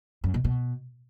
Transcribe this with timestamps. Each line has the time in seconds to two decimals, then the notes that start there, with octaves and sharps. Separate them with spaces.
0.24 F#2
0.34 B2
0.44 B2